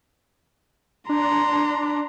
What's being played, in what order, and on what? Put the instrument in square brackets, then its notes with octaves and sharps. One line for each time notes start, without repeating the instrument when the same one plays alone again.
[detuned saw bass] D4 [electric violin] A#5 C6